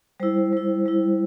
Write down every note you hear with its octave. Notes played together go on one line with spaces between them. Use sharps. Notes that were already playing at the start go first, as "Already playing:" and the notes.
G3 E4 C5
G3 E4
G3 E4